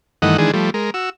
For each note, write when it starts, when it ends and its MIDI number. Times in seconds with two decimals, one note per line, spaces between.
0.22 0.37 43
0.22 0.37 51
0.22 0.37 52
0.22 0.37 57
0.22 0.37 75
0.22 0.37 78
0.38 0.51 51
0.38 0.51 52
0.38 0.51 56
0.38 0.51 62
0.38 0.51 68
0.54 0.70 53
0.54 0.70 55
0.54 0.70 57
0.74 0.90 56
0.74 0.90 70
0.94 1.10 66
0.94 1.10 88